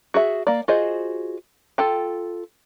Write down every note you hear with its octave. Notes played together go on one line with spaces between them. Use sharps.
F#4 G#4 E5
A#3 D5
F4 F#4 G#4 C5 D#5
F4 A4 G5